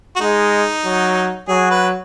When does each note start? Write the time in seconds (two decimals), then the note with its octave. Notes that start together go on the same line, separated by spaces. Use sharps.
0.16 F#4
0.21 G#3 D#4
0.85 F#3
1.48 F#3 G#4
1.71 B4